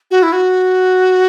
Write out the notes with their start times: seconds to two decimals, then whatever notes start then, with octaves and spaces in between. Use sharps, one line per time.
0.11 F#4
0.23 E4
0.33 F#4